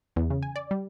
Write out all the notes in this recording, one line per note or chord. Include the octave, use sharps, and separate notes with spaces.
E2
C#3
G#5
D5
G3